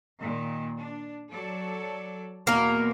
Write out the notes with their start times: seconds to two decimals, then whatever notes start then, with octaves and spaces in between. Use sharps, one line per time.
0.19 A#2 D#3
0.78 D4
1.31 F#3 A4 D5
2.47 E2 B2 A#3 A#4